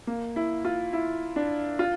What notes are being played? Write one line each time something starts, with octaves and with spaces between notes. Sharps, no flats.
A#3
E4
F4
E4
D4
F4